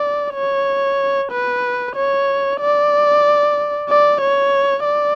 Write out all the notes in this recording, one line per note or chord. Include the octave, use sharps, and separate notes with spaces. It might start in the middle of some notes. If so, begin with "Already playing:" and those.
Already playing: D5
C#5
B4
C#5
D5
D5
C#5
D5